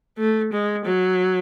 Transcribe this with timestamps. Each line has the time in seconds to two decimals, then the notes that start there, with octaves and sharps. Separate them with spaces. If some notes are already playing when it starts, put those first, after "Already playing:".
0.18 A3
0.52 G#3
0.85 F#3